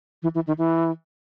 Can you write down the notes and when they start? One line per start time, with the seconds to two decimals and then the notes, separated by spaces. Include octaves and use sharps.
0.23 E3
0.35 E3
0.47 D#3
0.58 E3